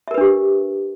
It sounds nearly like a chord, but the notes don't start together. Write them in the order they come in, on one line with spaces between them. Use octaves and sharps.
E5 A#4 B4 D4 G4